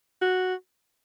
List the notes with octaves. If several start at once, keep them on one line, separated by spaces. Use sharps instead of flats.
F#4